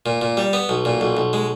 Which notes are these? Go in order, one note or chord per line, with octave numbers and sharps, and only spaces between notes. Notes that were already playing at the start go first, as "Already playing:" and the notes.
A#2
A#2
G3
B3
B1
A#2
B1
B1
G#3